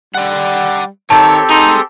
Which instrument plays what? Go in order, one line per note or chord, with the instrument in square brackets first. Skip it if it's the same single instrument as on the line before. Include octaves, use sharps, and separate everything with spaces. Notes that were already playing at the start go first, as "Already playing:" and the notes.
[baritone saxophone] G3 [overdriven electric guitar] D5 F#5
[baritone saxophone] D#3 [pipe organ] C4 G4 A4 [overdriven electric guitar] C#5 [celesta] A5
[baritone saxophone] D#4 [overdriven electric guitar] G#4 C6